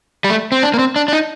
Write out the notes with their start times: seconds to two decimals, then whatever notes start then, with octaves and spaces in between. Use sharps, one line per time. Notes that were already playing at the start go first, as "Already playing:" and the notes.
0.24 G3
0.30 A3
0.52 C4
0.63 D4
0.74 A#3
0.79 C4
0.96 D4
1.08 D4
1.13 D#4